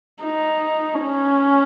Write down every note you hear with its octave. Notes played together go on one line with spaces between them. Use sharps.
D#4
C#4